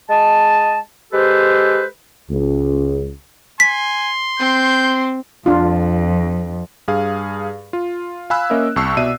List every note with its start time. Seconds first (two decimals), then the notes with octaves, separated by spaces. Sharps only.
0.10 G#3 D#5 A5
1.12 G#3 G4 A4 B4 C5
2.30 C#2
3.60 G#5 C6 B6
4.39 C4 G6
5.46 F2 D4 F4
6.88 G2 G#4 F5
7.73 F4
8.30 F5 G#5 B5 E6 F#6
8.50 A#3 C#4 A#4 D#5 E5
8.76 C2 A5 C#6 E6 C7
8.97 B2 D5 E5 D#7